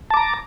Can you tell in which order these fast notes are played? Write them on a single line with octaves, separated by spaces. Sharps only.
A5 D6 A#5